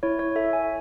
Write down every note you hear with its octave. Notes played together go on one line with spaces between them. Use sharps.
E4 C#5
C#5
A4 E5
G#5